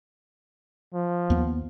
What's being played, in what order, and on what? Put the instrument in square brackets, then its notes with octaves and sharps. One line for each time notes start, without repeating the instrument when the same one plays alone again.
[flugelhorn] F3
[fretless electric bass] D#2 B3